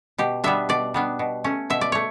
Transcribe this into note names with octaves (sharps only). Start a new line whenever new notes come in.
B2 G4
G3 B3 D4 E5
B2 D5
G3 B3 D4
B2
A3 C#4
B2 E5
D5
A3 C#5